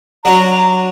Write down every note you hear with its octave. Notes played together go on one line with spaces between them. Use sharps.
F#3 D4 F#4 A#5